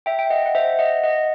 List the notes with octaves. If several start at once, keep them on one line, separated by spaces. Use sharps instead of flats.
E5 G5
G5
D#5 F#5
F#5
C5 E5
D#5 F#5
D#5 F#5